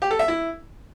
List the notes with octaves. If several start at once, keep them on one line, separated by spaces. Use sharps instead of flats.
G4
A4
E5
E4